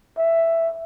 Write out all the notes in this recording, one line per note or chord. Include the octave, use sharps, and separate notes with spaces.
E5